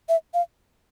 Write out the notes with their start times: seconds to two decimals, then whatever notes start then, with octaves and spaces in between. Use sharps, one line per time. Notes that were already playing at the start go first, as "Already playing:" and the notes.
0.09 E5
0.34 F5